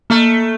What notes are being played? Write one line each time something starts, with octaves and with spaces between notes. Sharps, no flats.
A3 A#3